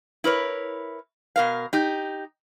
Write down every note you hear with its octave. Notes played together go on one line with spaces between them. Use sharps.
E4 A#4 B4 C#5
B2 A#4 F5
D#4 G4